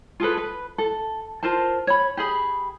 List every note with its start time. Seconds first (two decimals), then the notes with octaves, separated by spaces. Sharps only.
0.20 F4 G#4 A4 B4
0.37 B4
0.78 A4
1.43 F4 A#4 C5 A5
1.87 C#5 B5
2.17 G4 G#4 B5